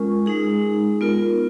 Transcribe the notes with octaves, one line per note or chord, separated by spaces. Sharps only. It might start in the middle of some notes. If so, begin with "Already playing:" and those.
Already playing: G#3 C#4 F4 A#4
G#3 D#4 G#4
B3 F4 A#4